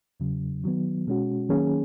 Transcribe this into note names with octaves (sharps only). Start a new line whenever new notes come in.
E2 C#3 F#3
D#3 F#3 B3
B2 G#3 C#4 F#4
D#3 F#3 A#3 C#4 G#4